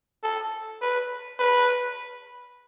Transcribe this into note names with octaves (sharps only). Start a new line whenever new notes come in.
A4
B4
B4